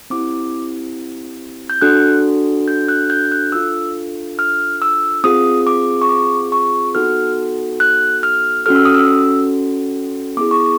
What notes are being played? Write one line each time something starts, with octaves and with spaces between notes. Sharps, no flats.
C4 E4 G4 D6
G6
D4 F#4 A4 F#6
G6
F#6
G6
F#6
D4 F4 A4 E6
F6
E6
C4 F4 G#4 D#6
D6
C#6
D6
C#6
B3 D#4 F#4 A4 F6
F#6
F6
C#4 F#4 A4 F6
E6
D#6
E6
B3 E4 G#4 D6
C#6